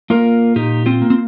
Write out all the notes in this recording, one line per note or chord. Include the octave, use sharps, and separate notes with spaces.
A#3 F4 A#4
A#2 D#4 G4
C4 F4
A#3
C4